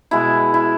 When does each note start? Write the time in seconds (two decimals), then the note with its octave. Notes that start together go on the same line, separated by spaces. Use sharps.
0.11 B2 G#3 B3 E4
0.54 E4